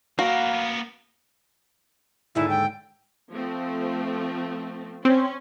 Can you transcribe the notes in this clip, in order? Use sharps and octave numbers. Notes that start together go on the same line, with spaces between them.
A#3 B3 F#4 F5
D#2 G#2 D3 E4
G5
F3 A3 C4
C4 C#4